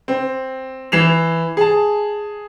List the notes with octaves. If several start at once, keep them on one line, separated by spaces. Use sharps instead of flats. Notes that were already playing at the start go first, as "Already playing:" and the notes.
C4
E3 C7 E7 F7
G#4 A5